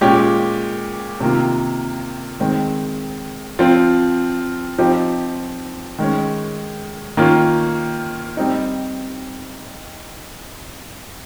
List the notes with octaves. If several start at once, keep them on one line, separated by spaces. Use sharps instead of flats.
A#2 G#3 C#4 G4
C3 D#3 A#3 F4
D#3 G#3 C4
F3 C4 F4
F3 C4 D#4 G4
D#3 G#3 C#4
D#3 A#3 C#4 F4
G3 C4 D#4